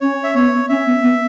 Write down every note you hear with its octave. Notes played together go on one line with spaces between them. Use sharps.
C#4 C#5
E5
B3 C#5
C#4 E5
B3
B3